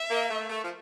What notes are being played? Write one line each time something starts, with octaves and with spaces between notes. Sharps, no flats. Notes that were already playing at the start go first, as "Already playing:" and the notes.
Already playing: E5
A#3
A3
A3
F3